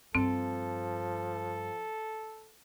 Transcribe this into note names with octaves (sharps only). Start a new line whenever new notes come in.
G2 F3 C4 A4